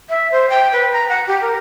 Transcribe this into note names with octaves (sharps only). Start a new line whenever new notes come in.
E5
C5
G5
B4
A#5
F#5
G4
A#4